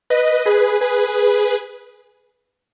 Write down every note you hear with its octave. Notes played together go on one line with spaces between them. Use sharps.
B4 D#5
G#4 B4
G#4 B4